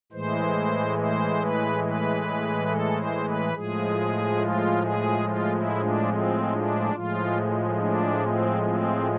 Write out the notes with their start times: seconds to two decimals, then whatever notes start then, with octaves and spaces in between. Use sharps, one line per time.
0.12 A2 E3 G#3 C5
0.98 C5
1.41 B4
1.83 B4
2.69 A4
2.96 C5
3.25 B4
3.53 A2 F3 G#3 G#4
4.38 F4
4.81 G#4
5.23 F4
5.52 E4
5.80 D4
6.09 C4
6.51 D4
6.94 A2 F3 G#3 F4
7.79 D4
8.21 C4
8.63 C4